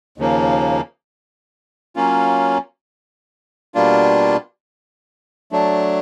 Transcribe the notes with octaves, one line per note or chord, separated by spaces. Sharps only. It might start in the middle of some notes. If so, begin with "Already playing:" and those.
D#2 C#3 F3 A#3
F#3 A#3 C#4 F4
B2 G3 A#3 D4 F4
F#3 A3 D4